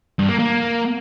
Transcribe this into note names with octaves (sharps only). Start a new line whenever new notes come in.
G2
A#3
A#3